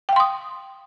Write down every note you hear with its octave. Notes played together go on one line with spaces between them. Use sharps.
F5 G5 C6 D#6